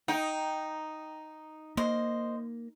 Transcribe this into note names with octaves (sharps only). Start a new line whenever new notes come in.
D#4 G5
A#3 C5 D#5